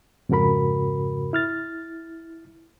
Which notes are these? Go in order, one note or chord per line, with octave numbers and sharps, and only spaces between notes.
F2 G#2 C#3 F#4 A#4 B5
E4 F6 A6